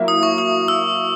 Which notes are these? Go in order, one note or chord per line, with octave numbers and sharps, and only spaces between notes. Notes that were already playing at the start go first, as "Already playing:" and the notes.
Already playing: F#3 A#3 E4
D#6
C#6
D#6
E6